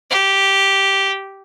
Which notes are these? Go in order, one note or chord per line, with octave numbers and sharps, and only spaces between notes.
G4